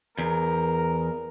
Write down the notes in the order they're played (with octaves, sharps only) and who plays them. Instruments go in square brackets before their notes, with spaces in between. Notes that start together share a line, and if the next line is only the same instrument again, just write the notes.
[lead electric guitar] E2 [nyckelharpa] A#4